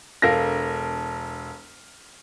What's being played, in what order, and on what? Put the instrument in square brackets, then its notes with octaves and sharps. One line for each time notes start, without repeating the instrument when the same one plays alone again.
[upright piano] E1 A4 A#4 F5 A#6